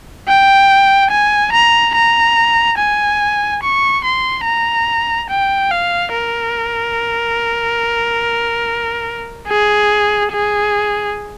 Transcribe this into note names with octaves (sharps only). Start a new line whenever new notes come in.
G5
G#5
A#5
A#5
G#5
C#6
C6
A#5
G5
F5
A#4
G#4
G#4